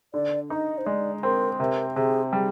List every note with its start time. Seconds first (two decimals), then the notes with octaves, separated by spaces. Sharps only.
0.14 D3 D5
0.50 D#4 D#5
0.78 C5
0.86 G#3 D5
1.23 C4 A#4
1.59 C3 A#4
1.96 C3 G#4
2.33 G3 G#4